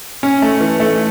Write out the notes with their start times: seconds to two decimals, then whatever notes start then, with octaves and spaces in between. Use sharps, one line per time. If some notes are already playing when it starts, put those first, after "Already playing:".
0.23 C#4
0.42 A3
0.60 E3
0.80 A3